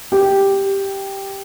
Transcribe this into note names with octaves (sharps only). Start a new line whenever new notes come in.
G4